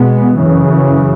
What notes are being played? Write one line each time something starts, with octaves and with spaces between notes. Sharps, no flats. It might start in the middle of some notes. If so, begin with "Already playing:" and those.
Already playing: B2 G#3 B3
F#2 C#3 E3